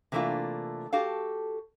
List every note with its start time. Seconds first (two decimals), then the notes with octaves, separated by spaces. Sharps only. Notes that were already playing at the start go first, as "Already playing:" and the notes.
0.12 C3 E3 A3 A#3 D4 F4
0.93 F#4 G4 A4 F5